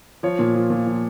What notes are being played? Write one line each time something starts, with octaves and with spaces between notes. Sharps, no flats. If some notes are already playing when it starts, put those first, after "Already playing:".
F3 C#5
A#2
F3
A#2
F3